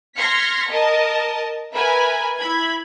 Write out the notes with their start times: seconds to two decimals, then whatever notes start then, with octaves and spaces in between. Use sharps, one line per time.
0.18 C6 F6 G#6 A#6 B6 C#7
0.69 A#4 D#5 A5
1.74 A#4 B4 E5 G#5 B5
2.39 E4 B5 G#6